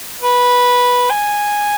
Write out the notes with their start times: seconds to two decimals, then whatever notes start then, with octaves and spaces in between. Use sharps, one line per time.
0.21 B4
1.10 G#5